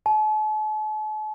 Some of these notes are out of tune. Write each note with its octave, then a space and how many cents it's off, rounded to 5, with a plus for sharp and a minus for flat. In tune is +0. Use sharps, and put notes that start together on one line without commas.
A5 -45